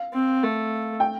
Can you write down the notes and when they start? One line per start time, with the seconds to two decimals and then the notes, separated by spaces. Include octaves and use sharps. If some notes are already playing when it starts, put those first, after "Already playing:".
Already playing: F5
0.14 C4
0.43 A3
1.00 G5